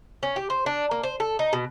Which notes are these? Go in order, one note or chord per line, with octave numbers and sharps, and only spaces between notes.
C#4
G4
C5
D4
A#3
C5
A4
D#4
B2